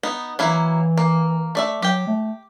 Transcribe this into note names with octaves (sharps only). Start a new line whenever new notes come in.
B3 D#4
E3 F#3 A#3 E4
A#3
A3 D5 E5
F#3 G4 G5
A3